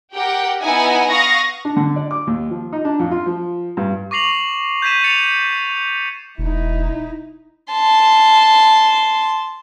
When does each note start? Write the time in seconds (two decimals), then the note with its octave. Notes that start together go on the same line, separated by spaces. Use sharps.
0.14 G4 A#4 F#5 G5
0.61 B3 D#4 E4 E5 F#5 G#5
1.08 F5 F#5 C#6 D#6 A#6
1.65 D4
1.76 D3
1.96 D5
2.11 D6
2.27 D#2
2.50 F3
2.73 D#4
2.85 D4
2.99 F2
3.11 F4
3.26 F3
3.77 G2
4.11 C#6 D6 A#6 C7 F7 F#7
4.82 G6 G#6 B6 D#7 E7
5.04 A6 C#7 F7
6.38 E1 D#4 E4
7.73 A5 C6